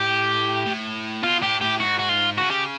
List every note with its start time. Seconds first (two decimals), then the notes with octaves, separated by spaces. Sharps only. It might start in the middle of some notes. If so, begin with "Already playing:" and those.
Already playing: A2 G4
0.66 A2
1.23 B2 F4
1.42 A2 G4
1.61 A2 G4
1.80 G#2 F#4
1.99 F#4
2.09 F4
2.38 C#3 F#4
2.50 G4